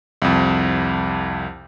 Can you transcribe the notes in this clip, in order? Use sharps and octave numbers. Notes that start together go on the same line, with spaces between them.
C2 F2